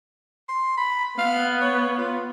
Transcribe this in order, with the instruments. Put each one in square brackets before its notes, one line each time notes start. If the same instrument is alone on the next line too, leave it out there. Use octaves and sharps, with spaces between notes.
[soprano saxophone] C6
B5
[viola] B3 [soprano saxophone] F5
[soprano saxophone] C#5
F4